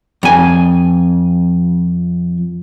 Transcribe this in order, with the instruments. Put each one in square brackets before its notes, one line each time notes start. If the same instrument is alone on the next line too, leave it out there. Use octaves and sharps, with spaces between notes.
[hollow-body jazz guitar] F2 G#5